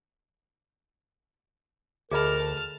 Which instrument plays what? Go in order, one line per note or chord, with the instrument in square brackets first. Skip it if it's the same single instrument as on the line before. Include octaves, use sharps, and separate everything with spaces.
[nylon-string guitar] D2 [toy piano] G#4 D#5 B5 [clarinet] A#4 [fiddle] A5 F6